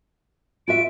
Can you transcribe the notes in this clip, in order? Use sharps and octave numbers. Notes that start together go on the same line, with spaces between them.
F4 F#4 E5 D7